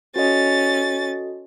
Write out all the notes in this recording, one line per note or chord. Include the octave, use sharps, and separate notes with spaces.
C#4 F#4 A4 D#5 A6